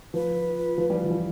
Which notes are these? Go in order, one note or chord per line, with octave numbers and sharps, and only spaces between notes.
F3 B4
F3
G3
F3
E3
F3